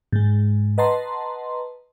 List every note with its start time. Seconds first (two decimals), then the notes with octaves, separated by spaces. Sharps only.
0.13 G#2 G#3
0.78 B4 D#5 F#5 A5 A#5 C6